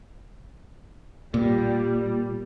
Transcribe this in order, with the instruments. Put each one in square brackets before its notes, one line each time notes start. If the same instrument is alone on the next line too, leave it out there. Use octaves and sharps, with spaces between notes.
[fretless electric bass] A#2 [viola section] G3